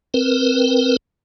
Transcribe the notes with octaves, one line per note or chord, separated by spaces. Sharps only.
C4 A#4 B4